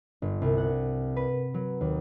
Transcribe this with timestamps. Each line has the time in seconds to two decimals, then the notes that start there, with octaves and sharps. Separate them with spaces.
0.22 G1
0.42 C2
0.58 F#5
1.16 B4
1.54 F#3
1.81 D#2